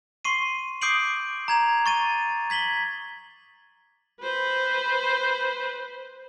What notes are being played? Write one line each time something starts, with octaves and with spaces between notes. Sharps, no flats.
C6 C#6 C7 D#7
D6 D#6 G6 C7 D7 F#7
A#5 G#6 F7
C#6 A6 D#7
G#6 B6 F#7 G7
B4 C5